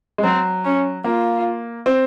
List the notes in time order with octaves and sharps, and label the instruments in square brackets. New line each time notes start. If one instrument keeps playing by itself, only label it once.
[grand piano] G#3
[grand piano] F#3 [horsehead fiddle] C4
[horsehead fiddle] C#4
[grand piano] A#3 [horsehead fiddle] F4
[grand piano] C4